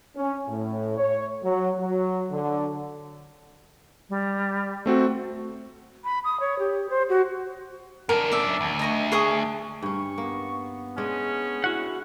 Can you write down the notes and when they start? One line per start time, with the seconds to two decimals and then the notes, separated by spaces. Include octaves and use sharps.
0.15 C#4
0.48 A2
0.97 C#5
1.44 F#3
1.79 F#3
2.31 D3
4.09 G3
4.86 A3 C4 F#4
6.04 B5
6.24 D#6
6.40 C#5
6.59 G4
6.90 C5
7.09 F#4
8.09 F#2 D4 A#4
8.32 D5 E5
8.61 D2
8.79 D#5 A#5 C#6
9.12 G#4 C#6 D#6
9.82 G2 C#4 C#6
10.18 A#3 B3
10.98 G#3 C#4 D4 D#5
11.64 E4 F#4 F#5